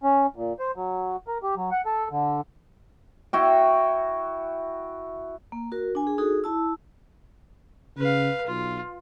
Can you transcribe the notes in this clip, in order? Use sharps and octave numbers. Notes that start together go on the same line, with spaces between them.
C#4
A#2
C5
F#3
A#4
G4
F#3
F#5
A4
D3
E4 F#4 G5
A#3
F#4 A#4
D4 G#5
G#4
D#4 F#4 G#4 A4
E4 A5 E6
C#3 B4 F5
B1 F4